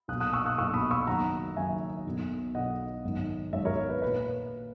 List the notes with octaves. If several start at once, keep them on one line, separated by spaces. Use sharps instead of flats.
B1 A#2 D#6 F#6
D#6 F#6
C#6 E6
D#6 F#6
B1 A#2 C#6 E6
B5 D#6
C#6 E6
F#1 F#2 D#3 F#5 A#5
F#1 F#2 D#3 E5 G#5
B1 B2
B1 B2 D#5 F#5
G#1 F#2 D#3
G#1 F#2 D#3 C#5 E5
A#4 C#5
B4
B4
A#2